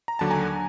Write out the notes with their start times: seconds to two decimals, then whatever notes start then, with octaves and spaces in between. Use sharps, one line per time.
0.08 A#5
0.19 D#2 D3 F#3 A5
0.31 G#5 A#5